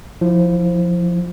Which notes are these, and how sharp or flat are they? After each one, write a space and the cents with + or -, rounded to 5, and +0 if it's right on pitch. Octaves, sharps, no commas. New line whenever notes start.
F3 +5 E4 +0